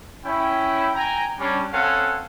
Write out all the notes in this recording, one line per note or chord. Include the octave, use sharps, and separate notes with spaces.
C#4 E4 G5
G5 G#5 A#5
G3 C#4 D4
C4 C#4 A4 F5 F#5 G#5